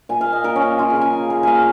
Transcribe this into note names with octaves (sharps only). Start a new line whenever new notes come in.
A#2 G#5
F5
A#3
D#5
A#2 A#4
C#4
A#3
C#3 F4
G#4
C#3
G#5
A#3
A#3
A#3 F5 G#5